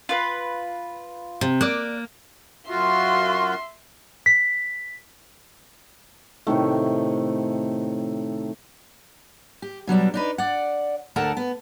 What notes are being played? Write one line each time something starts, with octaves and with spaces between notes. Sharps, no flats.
F4 B4
C3
A#3 D5 F#6
F#2 F4 F#4 E5 C6
B6
A2 C3 D#3 A3
G4
B2 F#3 G3 D4
D4 D#4 B4
D5 F#5
D2 A4 A#4 F#5 A5
B3